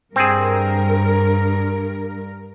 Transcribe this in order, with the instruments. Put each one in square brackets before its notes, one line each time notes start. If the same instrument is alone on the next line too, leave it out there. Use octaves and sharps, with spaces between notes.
[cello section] G2 A#4 [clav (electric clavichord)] C4 G#4